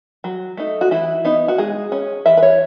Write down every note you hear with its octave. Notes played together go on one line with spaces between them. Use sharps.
F#3
A3 D#4
F#4
E3 E4
B3 D#4
F#4
G#3 G#4
C#4
E3 E5
B4
C#5